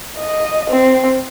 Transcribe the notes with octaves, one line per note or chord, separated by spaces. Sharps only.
D#5
C4